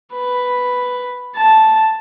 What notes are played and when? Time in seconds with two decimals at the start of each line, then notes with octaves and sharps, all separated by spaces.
0.13 B4
1.36 A5